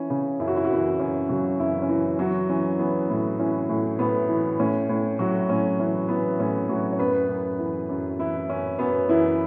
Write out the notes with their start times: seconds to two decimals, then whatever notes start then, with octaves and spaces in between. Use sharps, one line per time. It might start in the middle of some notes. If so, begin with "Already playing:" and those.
Already playing: E3 C#4
0.10 C#3
0.40 F#2 E4
0.48 F#4
0.56 E4
0.65 F#4
0.70 F#2 E3 E4
0.99 F#2 C#4
1.29 C#3 F#3 F#4
1.59 F#2 E3 E4
1.82 C#4
1.89 E3 E4
2.19 E3 F#3 F#4
2.49 E3 C#4
2.79 E3 B3
3.10 A2
3.39 E3 C#4
3.69 A2
3.99 A2 B3
4.29 E3
4.59 A2 C#4
4.89 A2
5.19 A2 F#3 F#4
5.49 A2 C#4
5.79 E3 C#4
6.09 E3 B3
6.40 A2 C#4
6.69 A2 F#3 F#4
6.93 C#5
6.99 F#2 B3 B4
7.29 F#2
7.59 E3
7.89 F#2
8.19 E3 E4
8.49 F#2 C#4
8.79 F#2 B3
9.09 F#2 E3 E4